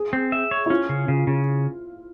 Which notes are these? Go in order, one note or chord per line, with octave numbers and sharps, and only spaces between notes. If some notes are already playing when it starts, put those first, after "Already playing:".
Already playing: G#4
C4
E5
C#5
E4
C#4 F4
C#3
C#3
C#3